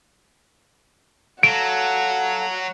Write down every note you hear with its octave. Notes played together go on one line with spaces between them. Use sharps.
F#3 A4 F5 F#5 D7